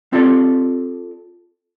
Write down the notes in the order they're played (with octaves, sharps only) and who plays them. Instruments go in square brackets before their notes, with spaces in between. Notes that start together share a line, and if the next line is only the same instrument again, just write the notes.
[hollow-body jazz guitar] C4 F4 G4 A4 D5